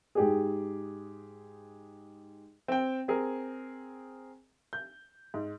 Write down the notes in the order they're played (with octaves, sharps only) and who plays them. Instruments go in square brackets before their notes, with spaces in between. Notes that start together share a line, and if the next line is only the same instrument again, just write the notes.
[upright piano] G#2 G4 G#4
C4 G5
C4 G#4 A#4
G6
G#2